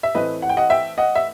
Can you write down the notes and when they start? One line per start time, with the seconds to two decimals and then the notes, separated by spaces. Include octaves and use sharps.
0.03 E5
0.15 A2 E3 A3 C4 B4 D#5
0.42 F#5
0.49 G5
0.57 D#5 F#5
0.70 E5 G5
0.98 D#5 F#5
1.15 E5